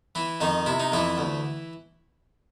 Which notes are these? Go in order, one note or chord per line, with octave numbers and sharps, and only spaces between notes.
E3 E4
F2 D#3 D#4
C3 E4
D#4
F2 E3 E4
D2